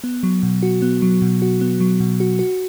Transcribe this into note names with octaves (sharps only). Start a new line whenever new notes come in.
B3
F#3
B2
F#4
B3
F#3
B2
F#4
B3
F#3
B2
F#4
F#4